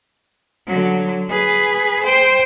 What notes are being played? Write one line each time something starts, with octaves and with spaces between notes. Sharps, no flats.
D3 F#3
G#4 B4
C5 G5